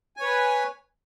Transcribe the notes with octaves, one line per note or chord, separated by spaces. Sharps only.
B4 C#5 G#5